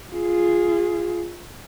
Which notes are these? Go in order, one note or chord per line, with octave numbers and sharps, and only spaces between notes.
F4 G#4